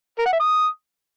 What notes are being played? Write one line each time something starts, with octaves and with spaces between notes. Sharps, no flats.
A#4
F#5
E5
D#6